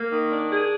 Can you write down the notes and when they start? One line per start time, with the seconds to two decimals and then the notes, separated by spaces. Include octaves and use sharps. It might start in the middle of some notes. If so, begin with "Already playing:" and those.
Already playing: A#3
0.12 D#3
0.32 D4
0.51 G#4